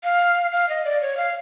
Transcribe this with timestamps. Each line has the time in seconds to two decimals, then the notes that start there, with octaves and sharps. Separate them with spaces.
0.04 F5
0.52 F5
0.69 D#5
0.85 D5
1.01 C#5
1.17 F5